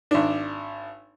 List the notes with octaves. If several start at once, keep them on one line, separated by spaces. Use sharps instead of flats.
G#1 D4